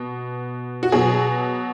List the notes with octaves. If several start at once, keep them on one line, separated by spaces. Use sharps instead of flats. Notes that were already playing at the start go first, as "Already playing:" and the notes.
Already playing: B2
F#4
B2 F#3 G#4